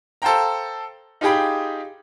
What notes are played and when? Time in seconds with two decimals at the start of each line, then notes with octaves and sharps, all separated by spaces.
0.22 A4 C5 F5 G5 A#5
1.21 D#4 F4 G4 G#4 G5 B5